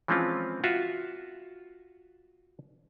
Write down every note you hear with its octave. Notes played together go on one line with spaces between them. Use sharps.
E3 F3 G#3 C4 C#4 F4
F4 F#4 E5